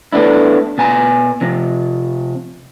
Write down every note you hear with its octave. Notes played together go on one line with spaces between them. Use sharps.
A3 B3 D4 E4
B2 G#5 A#5
C3 F3